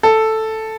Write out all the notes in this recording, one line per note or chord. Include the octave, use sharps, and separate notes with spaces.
A4